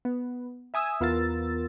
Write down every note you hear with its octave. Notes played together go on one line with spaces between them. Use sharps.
B3
E5 G#5 D#6 E6
E2 B3 F4 A#4 E6 A6